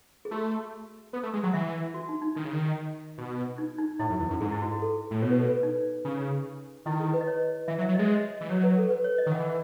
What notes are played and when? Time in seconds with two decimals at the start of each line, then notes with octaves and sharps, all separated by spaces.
0.25 G#4
0.31 A3 F#4
1.13 B3
1.23 A3
1.33 G#3
1.43 F#3 F#5
1.53 E3 E5
1.94 F#4
2.09 D#4
2.22 D#4
2.35 D#3 D#4
2.45 C#3
2.53 D#3
3.18 B2
3.58 D#4
3.78 D#4
3.99 A2 E4
4.10 F#2
4.20 E2
4.30 F#2
4.41 G#2 G#4
4.52 E4
4.62 F#4
4.71 G#4
4.82 A4
5.11 A2
5.22 B2 C#5
5.31 B4
5.39 A4
5.48 B4
5.63 D#4
6.05 C#3
6.86 D#3 E4
7.00 G#4
7.14 B4
7.21 D#5
7.27 C#5
7.68 E3 E5
7.78 F#3
7.81 E5
7.89 F#3
7.95 G#3 D#5
8.05 C#5
8.16 D#5
8.41 E3
8.50 F#3 C#5
8.63 B4
8.78 A4
8.90 B4
9.04 C#5
9.18 D#5
9.26 D#3
9.32 E3 F#5